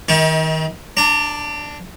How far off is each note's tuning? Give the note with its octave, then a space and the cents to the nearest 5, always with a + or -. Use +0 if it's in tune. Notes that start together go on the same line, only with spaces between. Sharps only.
D#3 +25 D#4 +45
D4 +0 A#5 -40